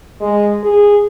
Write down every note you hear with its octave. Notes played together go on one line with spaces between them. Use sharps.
G#3
G#4